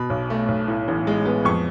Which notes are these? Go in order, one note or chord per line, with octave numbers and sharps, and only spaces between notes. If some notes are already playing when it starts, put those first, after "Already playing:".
Already playing: B2 B5
B1
A3
B1
A2
A1
G#3
B3
F2 C#6